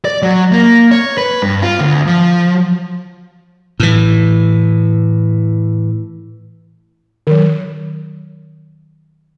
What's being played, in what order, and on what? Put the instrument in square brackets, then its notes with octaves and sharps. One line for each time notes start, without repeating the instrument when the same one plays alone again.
[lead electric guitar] D5
F#3
A#3
C#5
B4
G2
F4
D2
F3
[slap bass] A2 E3
[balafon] D#3 F#3